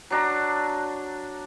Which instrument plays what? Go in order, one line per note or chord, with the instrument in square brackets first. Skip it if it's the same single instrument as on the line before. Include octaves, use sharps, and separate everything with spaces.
[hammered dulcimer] F#3 D4 A#5